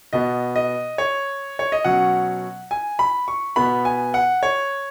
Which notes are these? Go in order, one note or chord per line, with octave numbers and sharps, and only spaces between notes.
B2 B3 D#5
D#5
C#5
C#5
D#5
B2 F#3 C#4 F#5
G#5
B5
C#6
B2 B3 B5
G#5
F#5
C#5